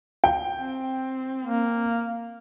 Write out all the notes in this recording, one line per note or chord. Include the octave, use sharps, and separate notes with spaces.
G5
C4
A#3